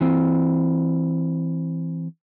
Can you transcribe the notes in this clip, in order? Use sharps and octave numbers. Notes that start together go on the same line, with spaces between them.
E3 C4